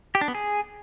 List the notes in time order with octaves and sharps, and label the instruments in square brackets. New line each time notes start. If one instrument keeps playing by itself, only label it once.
[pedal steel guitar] G4
D4
B3
G#4